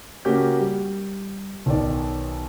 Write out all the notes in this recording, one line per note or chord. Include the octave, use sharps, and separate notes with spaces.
C#3 A#3 C#4 F#4 G4 G6
G3
B1 D#3 D5